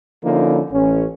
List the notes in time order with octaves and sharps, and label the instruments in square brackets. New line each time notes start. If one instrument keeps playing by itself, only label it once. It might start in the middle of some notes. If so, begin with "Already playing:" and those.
[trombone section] D3 F3 A#3 C#4 D#4 E4
A1 C#4